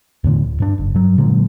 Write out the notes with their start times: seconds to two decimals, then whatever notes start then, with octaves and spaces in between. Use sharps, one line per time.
0.24 E2 A2 D3
0.43 D1
0.60 G2 D4
0.78 F#1
0.94 G2 F#3
1.18 A#2 D3 F#3 G#3